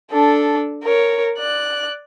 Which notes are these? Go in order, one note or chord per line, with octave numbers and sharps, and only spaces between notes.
D4 A4
A#4 C#5
D5 F#6